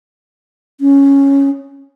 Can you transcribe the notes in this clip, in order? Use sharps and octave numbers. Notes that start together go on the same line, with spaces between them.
C#4